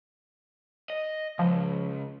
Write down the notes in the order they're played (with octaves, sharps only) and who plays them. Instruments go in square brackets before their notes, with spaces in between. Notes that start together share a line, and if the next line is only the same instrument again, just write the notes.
[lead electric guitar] D#5
[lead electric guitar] C#2 [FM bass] F3